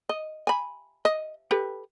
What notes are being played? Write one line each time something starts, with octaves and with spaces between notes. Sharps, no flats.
D#5
G#5 B5
D#5
G4 A4 B4